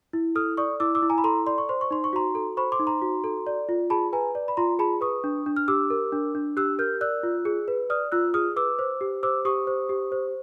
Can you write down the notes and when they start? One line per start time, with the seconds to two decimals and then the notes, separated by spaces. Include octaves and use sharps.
0.13 E4
0.35 A4 D#6 F6
0.57 D5 C#6 D#6
0.80 E4 D6 E6
0.95 D6 E6
1.02 E4
1.10 G#5 A#5
1.18 B5
1.24 A4 A#5 C6
1.46 D5 C6
1.58 C#6
1.69 C5 C6
1.81 C#6
1.91 D#4 C6
2.04 C#6
2.13 F#4 A#5 C6
2.35 A4
2.57 C5 B5 C#6
2.72 C6 D6
2.79 D#4
2.87 A#5 C6
3.02 F#4
3.24 A4
3.47 D5
3.69 F4
3.90 G#4 A5 B5
4.13 B4 G#5 A#5
4.35 D5
4.48 B5
4.57 F4 A#5 C6
4.79 G#4 A5 B5
5.01 B4 C#6 D#6
5.24 D4
5.46 D4
5.56 F6
5.68 G4 D6 E6
5.90 A#4
6.12 D4
6.35 D4
6.57 G4 E6 F#6
6.79 A#4 F6 G6
7.01 D5 E6 F#6
7.23 F4
7.45 G#4
7.68 B4
7.90 D5 D#6 F6
8.12 F4 E6 F#6
8.34 G#4 D#6 F6
8.56 B4 D6 E6
8.79 C5
9.01 G4
9.23 C5 D6 E6
9.45 G4 C#6 D#6
9.67 C5
9.89 G4
10.12 C5